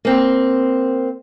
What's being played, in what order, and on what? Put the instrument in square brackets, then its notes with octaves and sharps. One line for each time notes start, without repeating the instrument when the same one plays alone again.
[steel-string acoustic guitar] A#3 C4